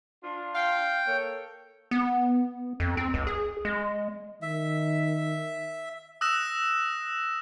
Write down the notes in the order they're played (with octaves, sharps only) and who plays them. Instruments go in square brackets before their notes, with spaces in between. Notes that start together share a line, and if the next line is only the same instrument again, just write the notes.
[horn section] D4 F4
[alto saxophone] F5 [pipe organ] G5
[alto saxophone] A#3 [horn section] A4 C#5
[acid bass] B3
F2
C4
C#2
G#4
G#3
[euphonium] D#3 [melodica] E5
[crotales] D#6 E6 F#6 A#6 E7